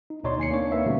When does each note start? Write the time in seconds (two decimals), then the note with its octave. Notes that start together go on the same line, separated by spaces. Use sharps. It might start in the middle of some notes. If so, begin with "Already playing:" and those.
0.10 D#4
0.24 D2 B2 D#4 C#5 D5 C6
0.38 D#2 G#5 C7 C#7
0.51 A#3 C4 D4 D#4 C#5
0.72 A#3 B4 E5
0.86 B2 D3 G3 A3 A#3 C#4